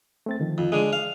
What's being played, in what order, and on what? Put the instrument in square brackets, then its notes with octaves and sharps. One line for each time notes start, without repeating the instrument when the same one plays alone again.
[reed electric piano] A3 C4 A6
D3 D#3 F3
[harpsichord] F2
[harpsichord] D3 G#3 [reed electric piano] G#4
[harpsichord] F5